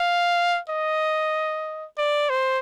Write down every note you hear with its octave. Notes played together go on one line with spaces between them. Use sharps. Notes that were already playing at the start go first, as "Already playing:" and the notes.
Already playing: F5
D#5
D5
C5